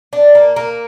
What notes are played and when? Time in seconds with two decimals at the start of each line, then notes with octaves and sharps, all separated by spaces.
0.13 D4
0.35 A#3
0.56 A#3